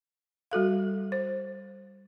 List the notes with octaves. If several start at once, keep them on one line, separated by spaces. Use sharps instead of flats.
G3 F#4 A4 F5
C5